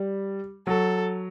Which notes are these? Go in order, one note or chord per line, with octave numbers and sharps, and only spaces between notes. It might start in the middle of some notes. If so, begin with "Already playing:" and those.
Already playing: G3
F#3 A4